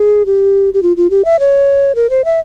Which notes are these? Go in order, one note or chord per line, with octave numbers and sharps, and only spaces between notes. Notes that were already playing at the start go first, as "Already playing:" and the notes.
Already playing: G#4
G4
G4
F4
F4
G4
E5
C#5
A#4
C5
E5